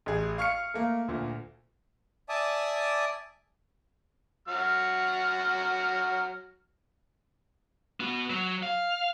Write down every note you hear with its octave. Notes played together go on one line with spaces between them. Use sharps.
A1 G#4
F5 C#6 F6 C7 C#7
A3 A#3
D2 A#2
D5 E5 G#5 A5 D6 D#6
F#3 F#4 F6
B3 F#4
F#3
F5